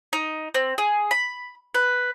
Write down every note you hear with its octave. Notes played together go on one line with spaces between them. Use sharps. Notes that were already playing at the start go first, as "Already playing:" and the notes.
D#4
C4
G#4
B5
B4